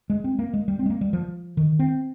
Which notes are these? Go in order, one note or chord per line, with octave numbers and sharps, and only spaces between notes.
G#3
C4
A#3
G#3
G3
C4
G#3
A#3
G3
F3
D#3
C4